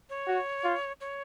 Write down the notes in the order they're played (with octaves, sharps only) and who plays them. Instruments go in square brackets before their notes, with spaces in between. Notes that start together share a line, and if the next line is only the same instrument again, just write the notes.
[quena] C#5
[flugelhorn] F#4
F4
[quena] C#5